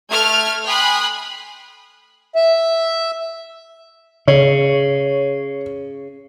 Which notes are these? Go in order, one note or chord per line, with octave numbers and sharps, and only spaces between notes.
A3 F6 G#6
G5 G#5 B5 C6 D#6 F#6
E5
C#3 C#5